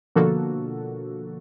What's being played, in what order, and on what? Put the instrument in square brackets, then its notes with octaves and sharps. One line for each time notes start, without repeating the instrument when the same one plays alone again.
[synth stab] B2 D3 F3 A#3 F#4 A4